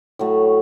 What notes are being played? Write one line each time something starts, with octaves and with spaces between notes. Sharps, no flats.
A2 F#3 A3